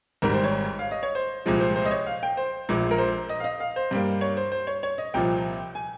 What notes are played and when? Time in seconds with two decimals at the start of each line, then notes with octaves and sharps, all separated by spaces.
0.22 G#1 G#2 G3 A#4
0.33 C5
0.44 C#5
0.79 F5
0.91 D#5
1.03 C#5
1.15 C5
1.46 C2 A#2 F3 G#3
1.60 C5
1.76 C5
1.85 D#5
1.91 C#5
2.06 F5
2.23 G5
2.37 C5
2.69 A#1 A#2 G#3
2.91 A#4
2.98 C5
3.29 D#5
3.40 F5
3.44 D#5
3.60 F5
3.76 C5
3.91 G2 G3 A#3
4.21 C#5
4.37 C5
4.52 C5
4.67 C#5
4.83 C#5
4.98 D#5
5.14 C2 A#2 F3 G5
5.75 G#5